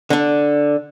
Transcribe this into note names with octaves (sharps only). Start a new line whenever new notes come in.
D3 D4